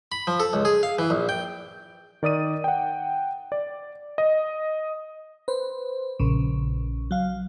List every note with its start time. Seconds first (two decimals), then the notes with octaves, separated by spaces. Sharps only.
0.12 B5
0.27 F3
0.40 A4
0.53 C#2
0.65 G#4
0.83 F5
0.99 E3
1.10 A#1
1.29 G5
2.23 D#3 D5 D#6 D#7
2.64 F#5 G5
3.52 D5
4.18 D#5
5.48 B4 C5
6.20 A#1 C#3
7.11 F#3 F5